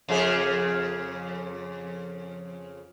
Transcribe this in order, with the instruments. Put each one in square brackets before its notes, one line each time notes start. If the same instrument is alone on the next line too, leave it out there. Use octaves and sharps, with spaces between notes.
[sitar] F2 C#3 G#4